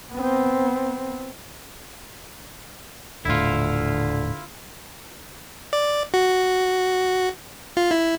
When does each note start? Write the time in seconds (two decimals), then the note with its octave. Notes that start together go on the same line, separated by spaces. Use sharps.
0.12 B3 C4
3.25 D#1 A2 D3 E4 F4
5.73 D5
6.14 F#4
7.77 F4
7.91 E4